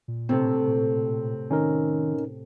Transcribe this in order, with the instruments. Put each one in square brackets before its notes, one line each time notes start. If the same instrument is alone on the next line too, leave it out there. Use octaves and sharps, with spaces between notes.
[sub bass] A#2
[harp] A2 C3 A3 [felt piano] C4
[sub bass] A#2
[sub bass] D#3 [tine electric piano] C#4 D#4 A#4